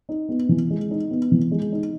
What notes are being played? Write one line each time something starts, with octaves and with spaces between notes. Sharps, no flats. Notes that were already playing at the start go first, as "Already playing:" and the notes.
D#4
B3
E3
G#3
D#4
B3
E3
G#3
D#4